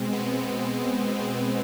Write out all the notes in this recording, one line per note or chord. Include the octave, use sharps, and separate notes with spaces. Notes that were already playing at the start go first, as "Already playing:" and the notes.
Already playing: B2 G#3 C4
B3
C4